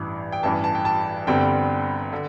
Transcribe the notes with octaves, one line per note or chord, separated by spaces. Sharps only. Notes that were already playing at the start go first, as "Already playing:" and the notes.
Already playing: A1 G2 E3
G5
A1 G2 E3 A5
A5
G5
A5
G1 G2 D3 G3 C4 G5
D3